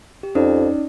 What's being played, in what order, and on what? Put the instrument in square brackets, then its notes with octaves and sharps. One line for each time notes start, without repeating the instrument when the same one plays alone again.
[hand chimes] G4
[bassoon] F2 [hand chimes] C#4 D#4 D5